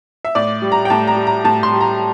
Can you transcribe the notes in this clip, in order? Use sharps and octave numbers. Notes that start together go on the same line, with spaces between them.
E5
A2 D5
G3
A#5
G5
A2 A5
A#5
G3
A#5
A2 A5
C6
G3
A#5